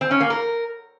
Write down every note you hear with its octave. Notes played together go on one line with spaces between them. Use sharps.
C4
C#4
A#3
A#4